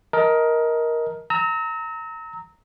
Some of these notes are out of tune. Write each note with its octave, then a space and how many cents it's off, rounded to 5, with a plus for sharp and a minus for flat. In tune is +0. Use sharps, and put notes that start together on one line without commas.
A#4 +10 D#5 +20 A5 +0
A#5 -20 E6 -40